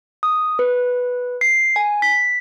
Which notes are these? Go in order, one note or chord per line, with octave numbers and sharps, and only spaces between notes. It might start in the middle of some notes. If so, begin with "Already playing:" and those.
D#6
B4
C7
G#5
B6